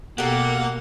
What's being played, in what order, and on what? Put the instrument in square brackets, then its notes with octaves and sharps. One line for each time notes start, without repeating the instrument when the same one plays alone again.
[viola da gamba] B2 [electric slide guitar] A#3 [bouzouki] G4 A4 [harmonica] F#5